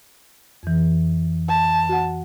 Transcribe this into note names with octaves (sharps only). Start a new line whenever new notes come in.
F2 E3
A5
F#4 F#5